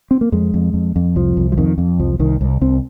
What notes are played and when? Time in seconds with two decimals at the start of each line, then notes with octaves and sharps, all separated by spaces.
0.11 C4
0.21 A#3
0.32 F2 G#3
0.54 F2
0.74 F2
0.96 F2
1.16 C2 F3
1.37 C2
1.52 F3
1.57 F2 D#3
1.78 F2
1.99 C2 F3
2.19 C2 D#3
2.41 C2
2.61 C2 C4